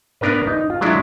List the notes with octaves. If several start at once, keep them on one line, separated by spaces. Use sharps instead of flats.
B3 D4 A#4 B4
D#4
F4
F#3 G#3 D4 E4